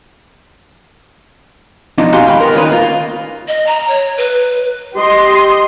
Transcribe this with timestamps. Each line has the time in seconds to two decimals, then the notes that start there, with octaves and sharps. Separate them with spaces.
1.98 B2 F3 D4 D#4
2.12 D#4 F#4 G4 F5 G#5 C6
2.25 D#2 G#2 G5 B5
2.40 B3 A#4
2.54 D#2 A#2 C#3 D#4 B4
2.72 A#3 F4
3.48 D#5
3.66 A#5
3.88 C#5
4.17 B4
4.95 G4 D#5 C6